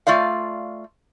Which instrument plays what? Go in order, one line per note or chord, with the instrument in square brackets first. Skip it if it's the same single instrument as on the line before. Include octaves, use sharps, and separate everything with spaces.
[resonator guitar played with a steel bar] A3 F4 D5 F5